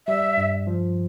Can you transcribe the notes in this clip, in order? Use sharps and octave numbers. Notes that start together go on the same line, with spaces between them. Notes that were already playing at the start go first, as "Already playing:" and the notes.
G3 E5
G2
F3